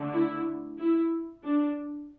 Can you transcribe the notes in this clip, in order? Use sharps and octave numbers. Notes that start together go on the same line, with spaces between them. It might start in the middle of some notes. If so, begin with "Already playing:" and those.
Already playing: D3 A3 D4
E4
E4
D4